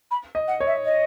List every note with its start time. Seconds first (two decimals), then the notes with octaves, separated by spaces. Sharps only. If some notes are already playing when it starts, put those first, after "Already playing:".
0.10 B5
0.35 D#5
0.47 F#5
0.60 C#5
0.66 E5
0.84 D#5